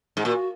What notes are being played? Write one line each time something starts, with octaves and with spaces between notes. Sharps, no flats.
G#2
A#2 F#4